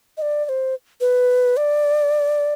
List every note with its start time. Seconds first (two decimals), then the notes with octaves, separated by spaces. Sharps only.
0.17 D#5
0.22 D5
0.45 D5
0.49 C5
1.01 B4
1.57 D5